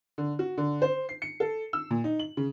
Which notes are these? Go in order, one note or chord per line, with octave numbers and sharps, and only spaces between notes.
D3
F#4
D3
C5
C7
C#7
A4
E6
A#2
D#4
F#7
C#3